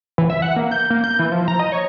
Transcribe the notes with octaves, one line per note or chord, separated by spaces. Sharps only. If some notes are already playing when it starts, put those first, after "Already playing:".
E3
E5
F#5
A#3
G6
A#3
G6
E3
F3
A#5
D#5
C#5